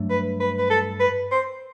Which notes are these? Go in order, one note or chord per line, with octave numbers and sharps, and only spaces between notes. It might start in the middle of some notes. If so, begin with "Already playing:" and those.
Already playing: G2 F#3 A3 D4
B4
B4
B4
A4
B4
C5